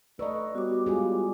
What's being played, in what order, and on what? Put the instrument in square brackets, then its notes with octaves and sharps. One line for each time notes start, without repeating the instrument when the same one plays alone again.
[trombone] A3 [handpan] B4 D#5 [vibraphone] D5 [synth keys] A#5 C#6 E6
[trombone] G3 [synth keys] B3 C#5 [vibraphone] F#4 D6
[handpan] G#3 F4 G#4